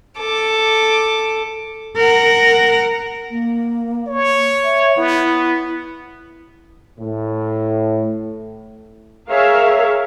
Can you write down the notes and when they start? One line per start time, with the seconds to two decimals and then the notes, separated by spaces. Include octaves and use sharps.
0.18 A4 D6
1.97 A#4 F#5
3.31 A#3
4.07 C#5
4.64 E5
4.97 B3 E4
6.99 A2
9.30 G#4 A#4 C#5 E5 F5